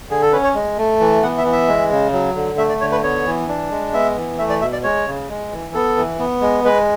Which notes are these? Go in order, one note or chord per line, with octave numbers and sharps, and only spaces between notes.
D3 G#4
A4
C#4 B4
C#5
G#3
A3
E3
B3 F#5
E5
E3
E5
G#3
C#3
F#3
D3
A3 E5
D5
D3 C#5
B4
B3 C#5
E3
D4
G#3
B3 E5
E3
A3 E5
D5
B2 E5
D5
G#3 C#5
C#3
G#3
E3
B3 A4
E3
B3
G#3
G#3 B4